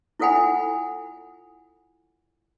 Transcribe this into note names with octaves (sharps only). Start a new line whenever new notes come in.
E4 F4 A4 F#5 G#5 B5